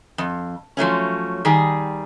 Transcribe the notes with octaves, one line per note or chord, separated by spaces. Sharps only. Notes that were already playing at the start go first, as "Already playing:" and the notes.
F2
F3 F#3 A3 C#4
D#3 G3 G#4